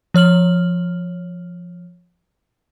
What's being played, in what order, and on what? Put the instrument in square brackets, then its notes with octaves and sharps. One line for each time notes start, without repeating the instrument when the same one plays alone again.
[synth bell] F3 C#5 F6 F#7